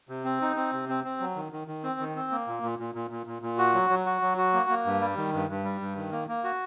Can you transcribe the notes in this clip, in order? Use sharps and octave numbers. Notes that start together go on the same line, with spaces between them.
C3
C4
D#4
C4
C3
C4
C4
F#3
D#3
D#3
D#3
C4
D#3
C4
A#3
A#2
A#2
A#2
A#2
A#2
A#2
A#2
F#4
F#3
F#3
F#4
F#3
F#4
A#3
A#3
G2
G3
D#3
G2
G2
G3
G2
D#3
A#3
A#3
F#4